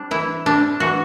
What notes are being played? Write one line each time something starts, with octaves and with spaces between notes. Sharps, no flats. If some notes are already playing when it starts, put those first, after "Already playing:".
Already playing: G3 C4 D4
E3 E4
G3 C4 D4
E3 F#4